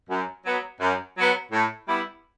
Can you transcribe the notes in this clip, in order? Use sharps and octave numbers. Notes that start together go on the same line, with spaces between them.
F#2
F#3 B3
F#2
F#3 B3
A2
G3 B3 E4